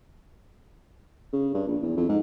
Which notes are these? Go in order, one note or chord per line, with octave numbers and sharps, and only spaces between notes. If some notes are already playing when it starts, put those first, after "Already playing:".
C#3
G2
A#1
E2
F2
G#2